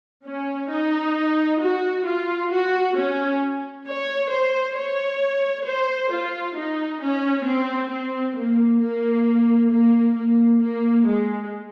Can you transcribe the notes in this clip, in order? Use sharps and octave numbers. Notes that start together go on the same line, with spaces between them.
C#4
D#4
F#4
F4
F#4
C#4
C#5
C5
C#5
C5
F4
D#4
C#4
C4
C4
A#3
A#3
A#3
A#3
A#3
G#3